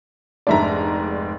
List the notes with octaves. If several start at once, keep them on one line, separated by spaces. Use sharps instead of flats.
F1 G#2 D4 D5 E5 A#5